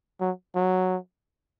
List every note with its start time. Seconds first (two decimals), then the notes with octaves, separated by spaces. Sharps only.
0.21 F#3
0.55 F#3